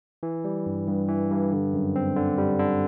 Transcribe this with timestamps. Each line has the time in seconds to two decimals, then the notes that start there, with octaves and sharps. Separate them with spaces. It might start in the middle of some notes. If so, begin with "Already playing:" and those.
0.23 E3
0.45 G3
0.66 G2
0.88 G2
1.09 E3
1.30 G2
1.53 D3
1.74 F#2
1.96 C4
2.16 D3
2.38 G3
2.59 D3